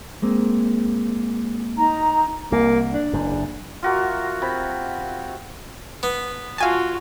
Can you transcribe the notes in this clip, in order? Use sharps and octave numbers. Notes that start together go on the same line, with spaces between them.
G#3 A#3 C4
D#4 A#5
C2 A#3
D4
F#1 E2
F4 F#4 A#4 E5
C3 B5
B3
F4 F#4 F5 G#5 A5